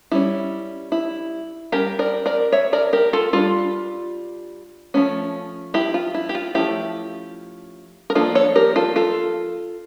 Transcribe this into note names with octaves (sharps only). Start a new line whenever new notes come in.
G3 C#4 E4
E4
G3 C#4 G4 A#4
A#4 D5
A#4 D5
C#5 E5
A#4 D5
G4 A#4
F4 A4
G3 D4 F4
F3 A3 C#4
E4 G4
F4
E4
G4
F4
F3 A3 C#4 E4 G4
A#4
F3 A#3 D4 F4 A4
A4 C#5
G4 A#4
F4 A4
F4 A4